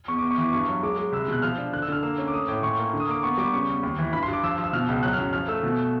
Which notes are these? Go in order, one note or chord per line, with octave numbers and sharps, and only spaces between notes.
E2 C#6
E2 D6
C#6
E3 D6
G2 C#6
F#3
G#3 D6
G#3
C2 E6
B2 F#6
F3 F6
D4
D3 F#6
E6
D3 F6
A#3 E6
C#4
D6
A3 D#6
A2 D6
A#2 C#6
A#3
D3
D#6
A#3 D6
B3 C#6
G3 D6
C#3 C#6
E2
D#2
E3
G2 B5
C6
G2
D6
F3 E6
F3
E6
B2 F6
C#2
F#3 F#6
F6
F#2
F3 F6
A3 E6
B2